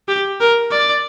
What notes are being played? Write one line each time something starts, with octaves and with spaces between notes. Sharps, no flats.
G4
A#4
D5